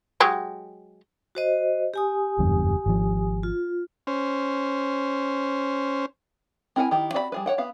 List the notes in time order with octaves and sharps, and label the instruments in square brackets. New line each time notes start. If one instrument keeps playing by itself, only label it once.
[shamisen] F#3 G#3 G4
[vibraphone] F#4 C5 D#5
G4 G#5 D#6
[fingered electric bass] F#1 E2 G2
G#1 F3
[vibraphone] F4
[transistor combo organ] C#4 C5
[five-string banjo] C4 E4 A#4 F#5 G#5
D#3 E4 G4
C4 F#4 D5 D#5 B5
G3 G#4 B4
C#5 F#5 G5
B3 F5